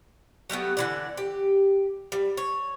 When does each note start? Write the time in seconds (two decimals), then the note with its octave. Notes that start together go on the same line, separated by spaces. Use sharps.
0.50 F#3 G3 A3 B3
0.77 D3 E3 D5
1.17 G4
2.12 G3
2.37 C#5